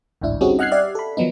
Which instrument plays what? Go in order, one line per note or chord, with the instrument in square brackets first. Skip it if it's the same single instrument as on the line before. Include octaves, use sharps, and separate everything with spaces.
[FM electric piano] A1 D2 G#2 D4 E4
G3 C4 C#4 D#4 F#4 G#4
D#5 F#5 F6 F#6 G#6 C7
G4 D5 E5
A4 B5
D#3 F3 F#3 B3 D#4